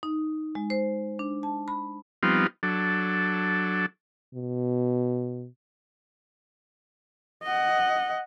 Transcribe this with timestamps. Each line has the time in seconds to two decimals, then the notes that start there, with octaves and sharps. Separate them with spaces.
0.03 D#4
0.55 G#3
0.70 C5
1.19 D4
1.43 A5
1.68 B5
2.23 F3 G3 B3 C4 D#4 F4
2.63 F#3 D4 A4
4.35 B2
7.43 D#5 F#5